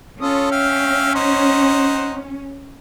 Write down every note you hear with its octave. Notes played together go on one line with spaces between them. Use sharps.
C#4 F4 A4 D#6
E5 F5 G5
D#4 C5 F#5